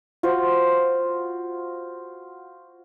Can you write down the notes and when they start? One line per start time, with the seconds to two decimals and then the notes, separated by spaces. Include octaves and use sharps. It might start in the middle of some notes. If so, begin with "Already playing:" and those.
0.23 F4 F#4 C5 F#5